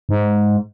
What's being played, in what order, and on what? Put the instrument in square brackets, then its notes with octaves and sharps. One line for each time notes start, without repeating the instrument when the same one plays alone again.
[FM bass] G#2